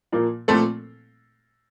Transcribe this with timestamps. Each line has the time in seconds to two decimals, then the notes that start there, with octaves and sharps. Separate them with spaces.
0.12 A#2 F3 A#3
0.48 A#2 F3 A3 C4 A4